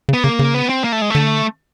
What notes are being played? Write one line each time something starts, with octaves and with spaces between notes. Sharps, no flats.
C#3
B3
C#3 A#3
C#3
B3
C4
A#3
A3
G#3
D3 A3